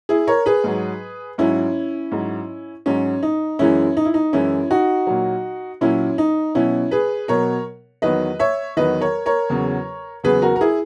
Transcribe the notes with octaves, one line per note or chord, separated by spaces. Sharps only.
E4 G#4
A#4 C#5
G#4 B4
G#2 F#3
G#2 F#3 C#4 E4
G#2 F#3
G#2 F#3 C#4
D#4
F#2 E3 G#3 C#4 E4
D#4
E4
D#4
F#2 E3 G#3 C#4 E4
D#4 F#4
A#2 F#3
A#2 F#3 C#4 E4
D#4
B2 F#3 C#4 E4
G#4 B4
B2 F#3 A#4 C#5
E2 D#3 F#3 B4 D#5
C#5 E5
E2 D#3 F#3 B4 D#5
A#4 C#5
A#4 C#5
E2 C#3 F#3
E2 C#3 F#3 G#4 B4
F#4 A#4
A#4
E4 G#4